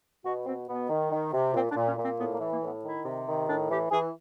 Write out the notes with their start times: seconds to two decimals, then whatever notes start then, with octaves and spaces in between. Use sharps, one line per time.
0.24 B2 F#4
0.46 B2 C4
0.68 B2 B3
0.89 D#3
1.11 D#3
1.33 C3
1.54 A#2 C4
1.70 D4
1.76 A#2
1.86 C#4
1.97 A#2
2.03 C4
2.19 A2 B3
2.34 A#3
2.40 E3
2.51 A#3
2.62 A2 B3
2.83 D#3 E4
3.05 C3
3.27 D#3
3.47 A2 D4
3.70 E3 G4
3.91 E3 G#4